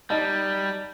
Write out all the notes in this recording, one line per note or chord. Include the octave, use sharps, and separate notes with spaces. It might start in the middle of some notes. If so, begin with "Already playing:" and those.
G3 D#4 D#5 A5